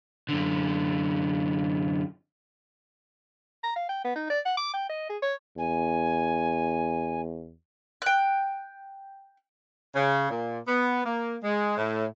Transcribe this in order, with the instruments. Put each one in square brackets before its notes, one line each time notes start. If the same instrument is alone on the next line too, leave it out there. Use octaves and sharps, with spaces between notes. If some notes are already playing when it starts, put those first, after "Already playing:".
[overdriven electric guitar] F#2 D3
[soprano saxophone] A#5
F5
G5
B3
D#4
D5
F#5
D6
G5
D#5
G#4
C#5
[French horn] E2 [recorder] G#5
[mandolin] G5 F#6
[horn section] C#3
A#2
B3
A#3
G#3
A2